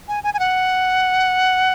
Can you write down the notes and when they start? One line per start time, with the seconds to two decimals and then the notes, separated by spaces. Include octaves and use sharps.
0.08 G#5
0.24 G#5
0.34 G#5
0.39 F#5